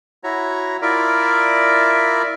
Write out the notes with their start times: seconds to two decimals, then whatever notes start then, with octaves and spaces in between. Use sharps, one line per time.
0.24 E4 F#4 C#5 A#5
0.82 E4 F4 A#4 D5 E5